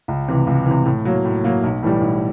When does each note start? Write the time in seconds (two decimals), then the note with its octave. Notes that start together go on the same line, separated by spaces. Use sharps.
0.08 C#2
0.28 C3 E3
0.47 C#2
0.66 C3 E3
0.86 A2
1.05 F#3 A#3
1.25 A2
1.44 F#3 A#3
1.63 B1
1.83 A2 E3 G3
2.01 B1